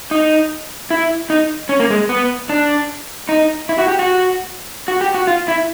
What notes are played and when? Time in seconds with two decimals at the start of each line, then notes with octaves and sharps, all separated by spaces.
0.11 D#4
0.90 E4
1.30 D#4
1.69 C#4
1.80 A#3
1.90 G#3
2.09 B3
2.49 D4
3.29 D#4
3.69 E4
3.79 F#4
3.88 G4
3.99 F#4
4.88 F#4
5.01 G4
5.14 F#4
5.27 F4
5.48 E4